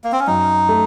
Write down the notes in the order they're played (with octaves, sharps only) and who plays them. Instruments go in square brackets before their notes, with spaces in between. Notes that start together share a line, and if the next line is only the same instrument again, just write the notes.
[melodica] A#3
C4
C#4
[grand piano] F#2 [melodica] D#4
[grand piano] A3